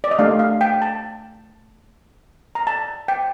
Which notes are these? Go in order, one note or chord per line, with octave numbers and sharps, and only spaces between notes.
D5
D#5
A3 D4 G4 F5
F5
G5
A5
A#5
A5
G5